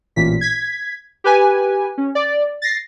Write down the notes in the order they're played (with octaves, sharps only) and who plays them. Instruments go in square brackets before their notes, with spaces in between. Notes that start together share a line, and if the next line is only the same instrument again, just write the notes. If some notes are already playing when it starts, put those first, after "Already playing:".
[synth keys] A1 A#2 B6
G#6 B6
G4 B4 G#5
C#4
D5
A6 A#6 C7